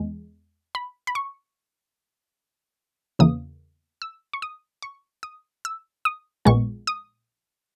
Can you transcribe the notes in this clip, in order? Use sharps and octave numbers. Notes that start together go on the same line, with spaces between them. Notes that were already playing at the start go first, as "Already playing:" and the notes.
Already playing: E2 G#3
B5
B5
C#6
E2 C#3 E3 A#3 D#6
E6
C#6
D#6
C#6
D#6
E6
D#6
A#1 A#2 G#3 B3 C#6
D#6